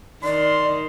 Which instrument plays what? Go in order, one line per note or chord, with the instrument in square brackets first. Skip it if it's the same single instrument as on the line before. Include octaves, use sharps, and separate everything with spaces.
[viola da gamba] D#3 [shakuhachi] D5 [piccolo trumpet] C6